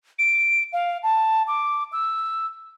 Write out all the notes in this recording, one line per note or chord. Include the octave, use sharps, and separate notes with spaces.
D7
F5
A5
D6
E6